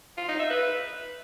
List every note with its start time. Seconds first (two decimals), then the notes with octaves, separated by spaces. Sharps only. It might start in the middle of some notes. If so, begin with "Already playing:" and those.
0.18 F4
0.28 D#4
0.39 E5
0.50 B4